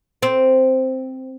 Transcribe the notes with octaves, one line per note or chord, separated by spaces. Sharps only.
C4